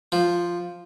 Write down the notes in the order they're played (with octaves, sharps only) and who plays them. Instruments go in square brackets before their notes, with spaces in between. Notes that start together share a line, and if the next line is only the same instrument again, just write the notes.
[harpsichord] F3